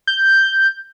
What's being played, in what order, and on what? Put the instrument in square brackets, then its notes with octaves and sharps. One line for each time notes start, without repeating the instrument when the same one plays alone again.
[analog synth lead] G6